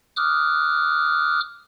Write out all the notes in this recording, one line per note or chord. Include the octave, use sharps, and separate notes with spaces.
D6 D#6 F6 F#6